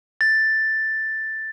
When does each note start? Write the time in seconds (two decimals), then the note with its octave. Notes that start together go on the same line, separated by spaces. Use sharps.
0.21 A6